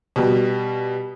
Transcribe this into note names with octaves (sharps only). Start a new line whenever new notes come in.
B2 G3